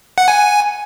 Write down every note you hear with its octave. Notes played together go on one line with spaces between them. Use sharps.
F#5
G#5
G#5